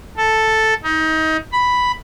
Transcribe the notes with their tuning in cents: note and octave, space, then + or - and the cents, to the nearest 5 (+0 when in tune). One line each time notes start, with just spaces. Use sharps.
A4 +0
D#4 +25
B5 +0